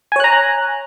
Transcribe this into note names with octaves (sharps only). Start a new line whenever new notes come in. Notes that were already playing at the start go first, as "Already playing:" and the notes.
C#5 G#5 A#5 F#6